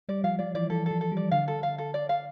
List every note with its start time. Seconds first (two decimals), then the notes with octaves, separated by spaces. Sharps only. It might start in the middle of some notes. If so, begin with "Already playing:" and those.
0.09 G3 D5
0.24 F3 F5
0.39 F3 D5
0.55 E3 D5
0.70 E3 A4
0.86 F3 A4
1.01 A4
1.12 G3 D5
1.31 D3 F5
1.48 A4
1.63 F5
1.78 A4
1.94 D5
2.09 F5